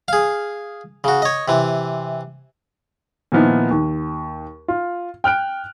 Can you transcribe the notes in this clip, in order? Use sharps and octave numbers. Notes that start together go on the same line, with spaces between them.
G#4 F5
C#3 F#4
C#5 D#5
C3 E3
A#2 D#3 F3 B3 D#4 E4
D#2
F4
G5 F6 F#6 D7